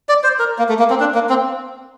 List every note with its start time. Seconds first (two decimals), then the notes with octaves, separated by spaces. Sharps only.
0.09 D5
0.24 C5
0.39 A#4
0.59 A#3
0.69 A3
0.79 A#3
0.90 C4
1.00 D4
1.15 A#3
1.29 C4